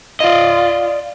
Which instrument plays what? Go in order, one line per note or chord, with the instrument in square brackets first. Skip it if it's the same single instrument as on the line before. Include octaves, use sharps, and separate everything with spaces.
[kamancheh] F4 [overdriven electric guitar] D5 D#5